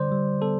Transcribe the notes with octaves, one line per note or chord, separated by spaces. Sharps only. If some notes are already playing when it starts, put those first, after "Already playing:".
Already playing: D3 G3 C5 D5
G3
B3 A4